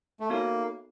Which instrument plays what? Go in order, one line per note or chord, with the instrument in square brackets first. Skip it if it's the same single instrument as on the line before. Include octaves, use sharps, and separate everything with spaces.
[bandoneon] A3
[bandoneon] A#3 [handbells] B3 D#4 F#4 A4 C#5